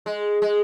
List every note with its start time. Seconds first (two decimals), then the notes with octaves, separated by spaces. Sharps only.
0.06 G#3
0.42 G#3